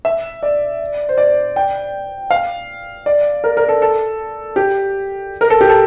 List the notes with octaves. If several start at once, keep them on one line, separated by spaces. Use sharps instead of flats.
E5
D5
C5
D5
G5
F5
D5
A#4
A#4
A4
A4
G4
A#4
A4
G4
A4